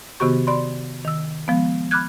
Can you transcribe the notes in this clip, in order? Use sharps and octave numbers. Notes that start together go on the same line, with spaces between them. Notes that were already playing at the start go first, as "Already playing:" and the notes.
C3 D#3 B3 F#4 G4 C#6
D5 B5 C6
D#3 E6
F3 G#3 B3
B5 D6 F6 F#6 G#6